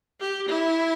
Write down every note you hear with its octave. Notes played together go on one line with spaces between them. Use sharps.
G4
E4